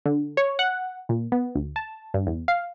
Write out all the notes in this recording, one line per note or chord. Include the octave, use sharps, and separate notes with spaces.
D3
C#5
F#5
A#2
B3
D2
A5
G2
E2
F5